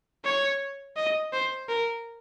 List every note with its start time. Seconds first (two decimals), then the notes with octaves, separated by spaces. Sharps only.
0.25 C#5
0.96 D#5
1.33 C5
1.69 A#4